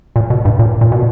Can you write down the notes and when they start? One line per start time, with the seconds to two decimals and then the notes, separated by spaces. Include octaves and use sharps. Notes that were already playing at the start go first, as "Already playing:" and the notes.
0.16 A#2
0.30 B2
0.45 G2
0.59 A#2
0.81 A#2
0.92 B2